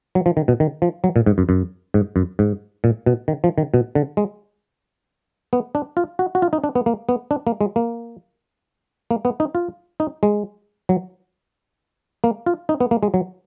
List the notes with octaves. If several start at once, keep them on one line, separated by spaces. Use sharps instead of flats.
F#3
F3
D#3
B2
D#3
F3
F#3
A#2
G#2
F#2
F#2
G#2
F#2
G#2
A#2
B2
D#3
F3
D#3
B2
D3
G#3
B3
D4
F4
F#4
F#4
F4
D#4
D4
B3
A#3
B3
D4
A#3
G#3
A#3
A#3
B3
D#4
F4
D#4
G#3
F#3
A#3
F4
D#4
B3
A#3
G#3
F#3